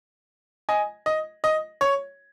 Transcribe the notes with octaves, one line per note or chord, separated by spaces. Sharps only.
D#5 G#5
D#5
D#5
C#5